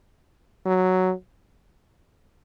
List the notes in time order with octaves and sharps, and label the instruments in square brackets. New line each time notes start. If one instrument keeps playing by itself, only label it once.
[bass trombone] F#3